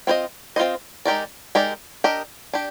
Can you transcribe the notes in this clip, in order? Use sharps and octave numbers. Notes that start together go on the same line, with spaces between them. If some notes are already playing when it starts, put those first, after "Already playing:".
C4 F4 C5 D#5
C4 F4 C5 D#5
G#3 D#4 G4 A#4 D5
G#3 D#4 G4 A#4 D5
D4 G4 A#4 D#5
D4 G4